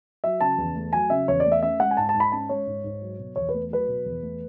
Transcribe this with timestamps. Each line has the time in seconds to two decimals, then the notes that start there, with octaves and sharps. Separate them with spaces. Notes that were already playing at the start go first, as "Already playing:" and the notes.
0.24 F#3 E5
0.41 C#3 A5
0.58 E2
0.75 A3
0.93 F#3 G#5
1.10 C#3 E5
1.28 E2 C#5
1.40 D5
1.45 A3
1.52 E5
1.63 C#4 E5
1.80 G#3 F#5
1.91 G#5
1.97 G#2 A5
2.09 A5
2.15 G#2
2.20 B5
2.32 C#4 A5
2.49 G#3 C#5
2.67 G#2
2.84 G#2
3.02 F#3
3.19 B2
3.36 E2 C#5
3.49 B4
3.54 A3
3.70 F#3 B4
3.88 B2
4.06 E2
4.23 A3